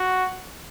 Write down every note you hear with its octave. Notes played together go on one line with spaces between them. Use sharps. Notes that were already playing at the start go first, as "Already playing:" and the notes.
Already playing: F#4